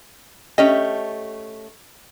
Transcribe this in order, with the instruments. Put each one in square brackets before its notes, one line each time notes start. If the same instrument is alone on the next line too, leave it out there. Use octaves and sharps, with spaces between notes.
[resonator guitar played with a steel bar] A3 C#4 G4 [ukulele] D#5